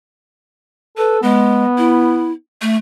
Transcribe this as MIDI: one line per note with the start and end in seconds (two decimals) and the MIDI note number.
0.98 1.18 69
0.98 1.18 71
1.23 1.64 56
1.23 2.34 59
1.78 2.32 64
2.62 2.76 57